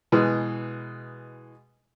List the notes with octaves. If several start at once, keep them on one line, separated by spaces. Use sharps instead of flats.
B2 E3 G#3